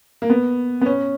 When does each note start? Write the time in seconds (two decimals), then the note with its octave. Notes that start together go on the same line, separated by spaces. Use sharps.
0.22 A#3
0.30 B3
0.81 B3
0.86 C#4